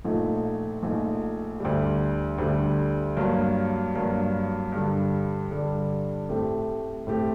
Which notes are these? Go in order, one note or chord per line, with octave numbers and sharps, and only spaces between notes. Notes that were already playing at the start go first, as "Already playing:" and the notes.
A#1 A#2 A3 D#4
A#1 A#2 A3 D#4
D2 D3 G3
D2 D3 G3
G2 F#3 A#3
G2 F#3 A#3
G2 D3 G3
G2 D3 G3
A2 A3 C4 G4
A2 A3 C4 G4